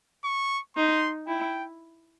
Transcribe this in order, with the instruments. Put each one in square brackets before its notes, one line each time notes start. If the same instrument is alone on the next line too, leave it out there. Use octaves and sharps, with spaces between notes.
[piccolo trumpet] C#6
[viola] D#4 [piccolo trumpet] C6
[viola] E4 [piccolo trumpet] G5